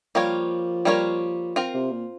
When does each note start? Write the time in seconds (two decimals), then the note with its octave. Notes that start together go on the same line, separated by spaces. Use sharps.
0.15 F3 G3 A#3 F4 A#4 C#5
0.85 G3 A#3 F4 A#4 C#5
1.56 C4 F4 A#4
1.74 C3
1.92 A#2